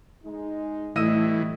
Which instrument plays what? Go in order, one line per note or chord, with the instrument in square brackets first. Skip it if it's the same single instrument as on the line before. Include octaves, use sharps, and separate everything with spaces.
[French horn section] G#3 D#4
[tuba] A2 [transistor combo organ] E3 [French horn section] G3 A3 [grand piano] D#5 E6 D#7